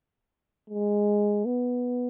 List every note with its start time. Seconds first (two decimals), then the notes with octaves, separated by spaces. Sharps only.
0.70 G#3
1.46 B3